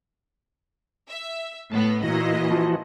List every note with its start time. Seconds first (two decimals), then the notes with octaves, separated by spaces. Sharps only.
1.08 E5
1.72 A2 B3 A5
2.03 A#2 E3 E4 F#4 D#5
2.51 F3